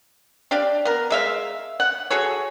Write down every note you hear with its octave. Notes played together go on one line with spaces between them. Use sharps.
D4 G4 D5 F5
B3 A#4
G#3 E5 F5
F#5
F#4 G#4 A4 C#5